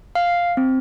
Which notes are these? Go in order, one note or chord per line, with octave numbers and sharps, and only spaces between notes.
F5
C4